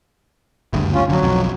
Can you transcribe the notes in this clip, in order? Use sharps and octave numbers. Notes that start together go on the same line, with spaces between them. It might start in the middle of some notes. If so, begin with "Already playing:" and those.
F#1 D2 G2
C#4 F4
F2 A2 D3 F#3
B1 F2